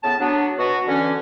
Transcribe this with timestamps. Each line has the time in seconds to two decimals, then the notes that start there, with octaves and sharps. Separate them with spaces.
0.03 A2 C#3 B3 A5
0.20 F#3 B3 D4
0.58 B2 B3 F#4
0.87 D3 E3 C#4